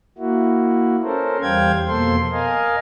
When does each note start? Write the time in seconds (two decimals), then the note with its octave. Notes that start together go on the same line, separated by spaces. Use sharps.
0.18 A#3 E4 F#4
1.04 C#4 A4 A#4 C5
1.42 E2 G3 C5 F5 G5 G#6
1.87 F2 B2 A#3 A4 C5 C6
2.32 A#4 D#5 F5 G#5